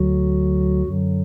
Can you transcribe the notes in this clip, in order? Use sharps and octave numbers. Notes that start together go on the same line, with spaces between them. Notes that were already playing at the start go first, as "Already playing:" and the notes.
Already playing: D2 D3 F#3 F#4
F#2 D3 F#3